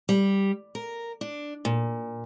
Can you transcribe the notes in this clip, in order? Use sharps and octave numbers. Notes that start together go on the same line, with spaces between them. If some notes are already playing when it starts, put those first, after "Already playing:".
G3
A#4
D4
A#2